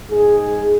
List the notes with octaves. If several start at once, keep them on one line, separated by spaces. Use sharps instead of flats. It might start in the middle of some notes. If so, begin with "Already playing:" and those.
G#2 G#3 G#4